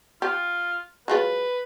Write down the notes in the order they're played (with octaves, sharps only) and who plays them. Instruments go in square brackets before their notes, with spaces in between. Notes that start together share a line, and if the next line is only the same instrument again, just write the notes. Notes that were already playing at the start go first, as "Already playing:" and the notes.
[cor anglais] F4 [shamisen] G4
[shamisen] F#3 G#3 F4 [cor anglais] B4